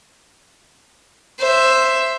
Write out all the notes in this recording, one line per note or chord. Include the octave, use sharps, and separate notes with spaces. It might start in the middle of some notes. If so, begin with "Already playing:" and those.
C5 E5